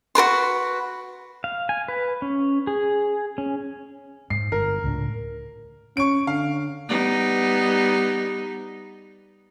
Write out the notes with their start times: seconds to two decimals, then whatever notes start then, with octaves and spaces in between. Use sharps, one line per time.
0.15 F#4 A#4 B4 C6
1.44 F5
1.69 G#5
1.88 B4
2.22 C#4
2.67 G#4
3.38 C#4
4.30 G#2 C7
4.52 G1 A#4
4.84 C#2 A2 D4
5.97 C#4 C#6 D7
6.27 D3 F5
6.88 G3 B3 D#4